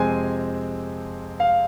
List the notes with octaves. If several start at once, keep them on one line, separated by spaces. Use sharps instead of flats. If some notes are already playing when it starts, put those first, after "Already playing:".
Already playing: F2 C3 G#3 C4 G#5
F5